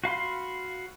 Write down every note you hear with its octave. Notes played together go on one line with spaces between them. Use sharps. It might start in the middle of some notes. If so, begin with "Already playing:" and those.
F#4 F5 B5 C6